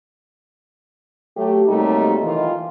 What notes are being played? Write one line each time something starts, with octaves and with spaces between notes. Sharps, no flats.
F#3 A3 G4
C3 F#3 G3 A3 A#3 D#4
D#3 E3 F4